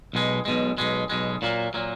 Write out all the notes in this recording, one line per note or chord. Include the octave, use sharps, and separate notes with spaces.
B1 B2 G#3
B1 B2 G#3
B1 B2 G#3
B1 B2 G#3
A#2 F#3 A#3
A#2 F#3 A#3